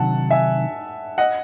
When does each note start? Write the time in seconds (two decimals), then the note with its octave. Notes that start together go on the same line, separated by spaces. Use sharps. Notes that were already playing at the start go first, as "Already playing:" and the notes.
Already playing: C3 D#3 F#3 F#5 A5
0.31 E5 G#5
1.18 D#5 F#5